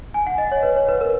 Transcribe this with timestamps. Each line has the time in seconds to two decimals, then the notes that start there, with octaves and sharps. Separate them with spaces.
0.14 G#5
0.27 F#5
0.38 D#5
0.51 C#5
0.63 B4
0.76 C#5
0.88 B4
1.01 A#4